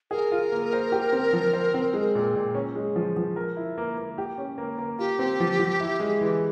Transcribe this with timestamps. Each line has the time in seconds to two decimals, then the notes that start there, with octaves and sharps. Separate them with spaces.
0.11 G#4 A#4
0.32 F4
0.52 A#3
0.73 C5
0.92 G4
1.13 C4
1.33 F3
1.53 C5
1.74 C4
1.94 G#3
2.15 A#2
2.35 A#2
2.55 C#4
2.75 G#3
2.96 F3
3.17 F3
3.36 A#4
3.57 E4
3.78 A#3
3.98 A#3
4.18 G4
4.38 C#4
4.58 A#3
4.78 A#3
4.99 F4 G4
5.19 C4
5.40 F3
5.59 F3
5.80 E4
6.00 G#3
6.21 E3